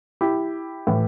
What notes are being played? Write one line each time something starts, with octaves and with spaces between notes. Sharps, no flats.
E4 G4
A2 E3